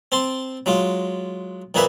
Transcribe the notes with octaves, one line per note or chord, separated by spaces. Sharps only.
C4 A5 C6
F#3 G#3 F4
F2 A#2 A#3 G#4 B4 E5